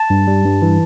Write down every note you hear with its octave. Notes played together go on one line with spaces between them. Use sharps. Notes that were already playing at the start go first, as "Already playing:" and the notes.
Already playing: A5
G2
G3
G2
E3